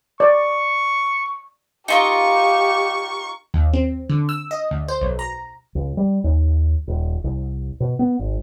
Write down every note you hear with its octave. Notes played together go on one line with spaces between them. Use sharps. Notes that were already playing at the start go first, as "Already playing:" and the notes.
D5 C#6
D#4 F4 G4 A#4 C#6
D#2
C4
D3
E6
D#5
D2
C5
B1
A#5
C#2
G3
D#2
D#1
C2
B2
B3
G#1